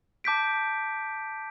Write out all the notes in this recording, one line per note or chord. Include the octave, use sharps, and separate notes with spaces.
A5 D6 G6 B6 D7